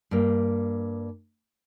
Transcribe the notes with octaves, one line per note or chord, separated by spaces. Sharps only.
G2 A#3